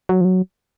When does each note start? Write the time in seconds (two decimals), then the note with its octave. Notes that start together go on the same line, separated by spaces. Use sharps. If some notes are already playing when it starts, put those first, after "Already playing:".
0.09 F#3
0.21 F3
0.25 F#3